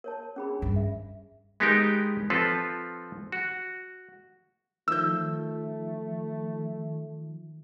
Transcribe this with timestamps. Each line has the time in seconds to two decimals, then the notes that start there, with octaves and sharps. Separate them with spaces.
0.04 A#4 C#5 A5
0.36 C#4 G#4 B5
0.49 D4
0.62 G2
0.76 E5
1.60 G#3 B3 D#4 G4 A#4 G5
2.30 F3 C4 F4 A4 B4
3.32 F#4
4.88 D#3 F3 A3 E6 G6